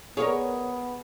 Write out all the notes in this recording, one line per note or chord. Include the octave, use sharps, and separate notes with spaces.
B3 G#4 A#4 C#5